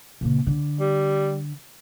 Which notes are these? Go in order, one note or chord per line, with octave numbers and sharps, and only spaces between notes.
A#2 C#3
D3
G3